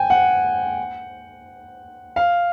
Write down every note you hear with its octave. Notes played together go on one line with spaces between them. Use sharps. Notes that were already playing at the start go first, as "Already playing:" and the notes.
Already playing: G5 G#5
F#5
F5